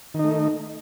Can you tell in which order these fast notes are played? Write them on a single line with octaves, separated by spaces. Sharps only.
D#3 D#4 A3